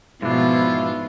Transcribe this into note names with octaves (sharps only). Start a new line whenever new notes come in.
G#2 B2 F3 B3 D4 E4 F4